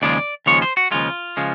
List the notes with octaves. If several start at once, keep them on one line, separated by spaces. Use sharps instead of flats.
D#2 C#3 F3 G#3 D5
D#2 C#3 F3 G#3 C#5
C5
F#4
D#2 C#3 F3 G#3 F4
C#3 F3 G#3